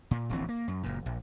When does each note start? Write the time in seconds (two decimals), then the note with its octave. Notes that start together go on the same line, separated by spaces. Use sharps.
0.11 A#2
0.29 D1 A#1 E3 C4
0.49 A#3
0.68 F#2
0.83 F#1 A#2
1.06 A#1